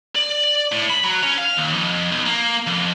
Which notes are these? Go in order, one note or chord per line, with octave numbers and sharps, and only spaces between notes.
D5
A2
B5
F#3
C#4
F5
D#2
F2
B1
A#3
F2